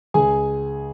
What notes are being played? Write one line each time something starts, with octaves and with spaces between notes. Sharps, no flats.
C#2 G#4 G#5